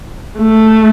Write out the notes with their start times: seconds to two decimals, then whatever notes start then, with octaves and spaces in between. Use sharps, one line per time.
0.39 A3